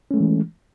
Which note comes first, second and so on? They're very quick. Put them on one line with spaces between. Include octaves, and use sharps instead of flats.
C#4 A3 G#3 E3